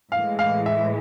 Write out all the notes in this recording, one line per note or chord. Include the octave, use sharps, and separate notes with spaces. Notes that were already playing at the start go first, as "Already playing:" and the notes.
A2 E3 G#3 F5
F5
E5